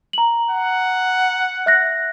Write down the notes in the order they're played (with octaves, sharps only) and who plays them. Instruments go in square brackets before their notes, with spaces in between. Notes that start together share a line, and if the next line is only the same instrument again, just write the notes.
[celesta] A#5 F#7
[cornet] F#5
[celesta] E5 F#6 A#6